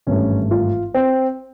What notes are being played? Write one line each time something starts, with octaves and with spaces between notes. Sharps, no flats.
G#1 G2 E3 A3 C#4
F4
C4